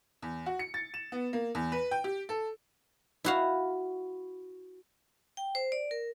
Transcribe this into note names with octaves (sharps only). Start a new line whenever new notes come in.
E2
F#4
C#7
A6
E7
B3
A#3
E2
B4
G5
G4
A4
E4 F#4 F5
G5
C5
D5
A#4